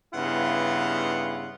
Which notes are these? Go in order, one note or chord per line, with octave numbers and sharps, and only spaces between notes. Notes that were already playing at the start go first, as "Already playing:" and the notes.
G2 C#3 B3 E4 F4 F#5